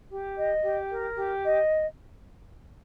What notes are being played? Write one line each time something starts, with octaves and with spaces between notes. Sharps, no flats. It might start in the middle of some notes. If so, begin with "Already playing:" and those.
G4
D#5
G4
A#4
G4
D#5